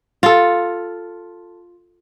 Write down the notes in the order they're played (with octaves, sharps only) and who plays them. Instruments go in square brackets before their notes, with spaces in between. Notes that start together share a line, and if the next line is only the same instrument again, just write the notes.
[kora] F4 A4